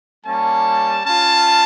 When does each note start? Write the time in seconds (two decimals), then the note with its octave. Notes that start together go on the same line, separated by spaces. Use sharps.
0.24 G3 A#3 C#4 A5
1.04 C#4 F4 A5